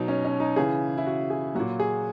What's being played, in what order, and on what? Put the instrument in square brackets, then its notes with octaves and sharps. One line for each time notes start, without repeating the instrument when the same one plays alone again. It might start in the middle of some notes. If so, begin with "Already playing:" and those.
Already playing: [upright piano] B2 F#3 D#4
C#4
C#4
D#4
C#3 E3 G#4
E4
F#4
G#4
A#2 F#3 F#4
G#4